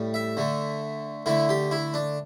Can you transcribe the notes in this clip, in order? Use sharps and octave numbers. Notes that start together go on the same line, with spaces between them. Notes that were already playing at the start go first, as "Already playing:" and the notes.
Already playing: A2 G3
E5
D3 A3
D3 A3 E4
G4
E4
D4